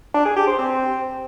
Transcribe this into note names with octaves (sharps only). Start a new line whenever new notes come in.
D4
G#4
G4
C5
C4